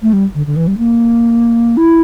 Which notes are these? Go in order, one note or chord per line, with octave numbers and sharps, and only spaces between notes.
A3
G3
D3
D3
E3
G3
A#3
E4